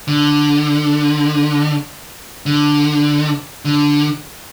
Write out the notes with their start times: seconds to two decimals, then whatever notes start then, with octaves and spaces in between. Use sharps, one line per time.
0.08 D3
2.46 D3
3.65 D3